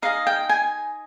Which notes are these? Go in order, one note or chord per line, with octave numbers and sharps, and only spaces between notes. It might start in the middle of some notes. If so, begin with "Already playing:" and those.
D#4 G#4 D#5 F5
G5
G#5